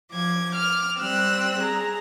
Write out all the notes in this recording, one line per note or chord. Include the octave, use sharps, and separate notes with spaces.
F3 D6 G#6
D6 F6
G3 C4 E6 F#6
G#4 A#5